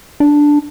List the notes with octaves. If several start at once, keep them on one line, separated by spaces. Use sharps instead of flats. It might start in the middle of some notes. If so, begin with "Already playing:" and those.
D4